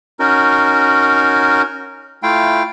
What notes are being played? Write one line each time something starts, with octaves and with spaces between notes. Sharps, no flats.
C#4 D#4 F#4 A#4
A3 E4 F4 F5 G5